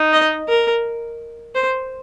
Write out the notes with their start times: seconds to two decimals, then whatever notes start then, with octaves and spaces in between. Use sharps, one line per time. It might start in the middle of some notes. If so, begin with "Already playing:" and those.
Already playing: D#4
0.13 D#5
0.48 A#4
1.55 C5